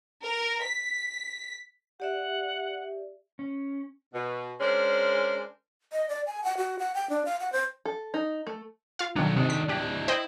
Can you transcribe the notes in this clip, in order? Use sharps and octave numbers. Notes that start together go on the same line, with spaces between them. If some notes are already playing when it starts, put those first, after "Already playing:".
A#4
B6
G4 D5 E5 F#5
C#4
B2
G#3 C#4 D4 A#4 C5
D#5
D5
G#5
F#5
F#4
F#5
G5
D4
F5
F#5
C5
A4
D#4
A3
F4 F5
B1 D#3 F#3 D4
C3 D#3 D4
B6
D4 E4 G4
E4 C5 D#5 G5